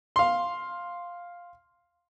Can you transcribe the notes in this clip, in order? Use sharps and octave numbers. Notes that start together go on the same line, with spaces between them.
F5 C6